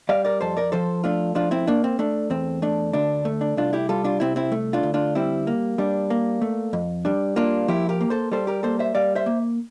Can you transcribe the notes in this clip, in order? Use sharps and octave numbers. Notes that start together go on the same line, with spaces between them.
G3 D5 F5
A#4 D5
F2 A4 C5
A#4 D5
F3 A4 C5
A3 D4 F4
F3 D4 F4
C4 E4
A#3 D4
C4
A3 D4
E2 C4
A3 D4
D2 D4
A3
D4
C2 D4 F4
E4 G4
G3 F4 A4
D4 F4
C2 C4 E4
C4 E4
A3
D4 F4
D2
D4 F4
G3 C4 E4
A#3
G3 D4
A#3
A3
F2
G3 D4
A#3 D4 F4
F3 E4 G4
G4 A#4
A#3
A4 C5
G3 A4 C5
G4 A#4
A#3 A4 C5
C5 E5
G3 D5 F5
C5 E5
A#3